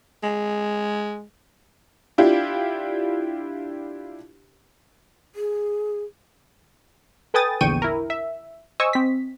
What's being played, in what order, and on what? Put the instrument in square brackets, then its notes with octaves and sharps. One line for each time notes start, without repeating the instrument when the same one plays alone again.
[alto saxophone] G#3
[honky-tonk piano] D4 E4 F4 G4
[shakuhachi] G#4
[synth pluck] A4 B4 G5 G#5 D#6 A6
A#1 E2 D3 G5 C#6 D#7
E4 A#4
E5
C5 D#5 G#5 C#6 D#6 E6
C4 B6